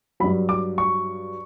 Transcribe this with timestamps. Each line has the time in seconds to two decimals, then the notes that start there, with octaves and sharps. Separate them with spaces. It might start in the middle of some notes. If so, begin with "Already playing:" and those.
0.20 G2 F#3 B5
0.49 D6
0.78 C#6